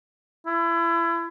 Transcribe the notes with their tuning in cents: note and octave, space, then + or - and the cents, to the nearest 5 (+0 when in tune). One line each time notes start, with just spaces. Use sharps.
E4 +30